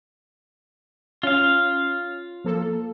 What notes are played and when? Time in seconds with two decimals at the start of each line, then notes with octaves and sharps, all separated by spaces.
1.23 C#4 F4 F5
2.45 F3 A#3 A4